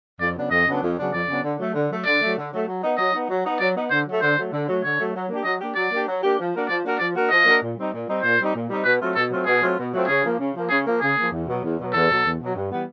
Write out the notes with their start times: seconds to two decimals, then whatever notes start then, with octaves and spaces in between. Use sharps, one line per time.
0.20 F2 D5
0.35 C#3 F#3 B3 D4
0.50 F2 D#5
0.67 C#3 F#3 B3 D4
0.82 F2
0.97 C#3 F#3 B3 D4
1.12 F2 D5
1.28 C#3 F#3 B3 D4
1.43 D3
1.59 F#3 A3
1.74 D3
1.90 F#3 A3
2.05 D3 D5
2.21 F#3 A3
2.36 D3
2.52 F#3 A3
2.67 F#3
2.82 B3 D#4
2.97 F#3 D#5
3.13 B3 D#4
3.29 F#3
3.44 B3 D#4
3.60 F#3 D5
3.75 B3 D#4
3.91 D3 C5
4.06 F#3 A3
4.21 D3 C5
4.37 F#3 A3
4.52 D3
4.68 F#3 A3
4.83 D3 C#5
4.98 F#3 A3
5.14 F#3
5.29 A#3 D4 G4
5.45 F#3 D#5
5.60 A#3 D4 G4
5.75 F#3 D5
5.91 A#3 D4 G4
6.06 F#3
6.22 A#3 D4 G4
6.38 F3
6.53 A#3 D4 F#4 A#4
6.68 F3 D5
6.84 A#3 D4 F#4 A#4
6.99 F3 D5
7.14 A#3 D4 F#4 A#4
7.30 F3 D#5
7.45 A#3 D4 F#4 A#4
7.61 A#2
7.77 G3 C4 D#4
7.92 A#2
8.07 G3 C4 D#4
8.22 A#2 C5
8.38 G3 C4 D#4
8.54 A#2
8.69 G3 C4 D#4
8.84 B2 B4
9.00 F#3 A3 C4 F4
9.15 B2 A4
9.31 F#3 A3 C4 F4
9.46 B2 G#4
9.61 F#3 A3 C4 F4
9.77 B2
9.92 F#3 A3 C4 F4
10.07 C#3 G#4
10.23 F3 A#3
10.39 C#3
10.54 F3 A#3
10.69 C#3 G#4
10.85 F3 A#3
11.01 C#3 G#4
11.16 F3 A#3
11.31 E2
11.47 B2 F#3
11.62 E2
11.78 B2 F#3
11.93 E2 A4
12.09 B2 F#3
12.25 E2
12.40 B2 F#3
12.55 G2
12.70 E3 G3 B3